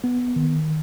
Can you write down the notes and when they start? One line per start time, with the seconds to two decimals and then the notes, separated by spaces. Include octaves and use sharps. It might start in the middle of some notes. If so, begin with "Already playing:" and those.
0.04 B3
0.36 D#3